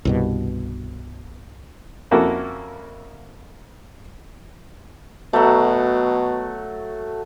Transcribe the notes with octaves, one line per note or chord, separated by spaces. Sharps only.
C2 G2 B2
F2 A#3 C#4 E4 F#4 A4
B2 F#3 A3